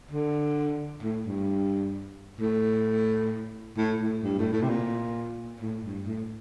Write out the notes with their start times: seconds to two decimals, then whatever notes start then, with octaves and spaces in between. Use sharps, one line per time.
0.11 D3
1.03 A2
1.26 G2
2.40 A2
3.77 A2
4.00 A2
4.23 G2
4.39 A2
4.53 A2
4.62 C3
4.69 A#2
5.60 A2
5.84 G2
6.06 A2